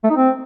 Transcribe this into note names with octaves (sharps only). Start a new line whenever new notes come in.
A3
D#4
C4